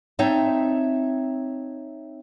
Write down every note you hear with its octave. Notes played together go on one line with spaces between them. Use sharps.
C4 D#4 C#5 E5 A5